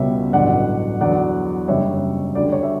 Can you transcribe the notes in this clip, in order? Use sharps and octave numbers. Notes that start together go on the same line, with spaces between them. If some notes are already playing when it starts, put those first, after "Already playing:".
Already playing: C#2 B2 G3 C#5 E5
A1 G2 D3 F#3 D5 F#5
E2 D3 F#3 D5 F#5
F#1 F#2 D3 G3 C#5 E5
D2 D3 G3 D5
C#5
E5